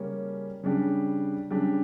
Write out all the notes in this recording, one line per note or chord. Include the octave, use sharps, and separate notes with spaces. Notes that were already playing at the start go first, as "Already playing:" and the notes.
Already playing: C#3 G3 A#3 C#4
C#3 G3 D4 G4
C#3 G3 D4 G4